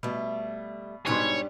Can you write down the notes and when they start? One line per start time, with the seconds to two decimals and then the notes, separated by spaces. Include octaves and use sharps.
0.03 B2 G3 A3
1.07 G#2 B2 G3 D4 G4 C#5 C6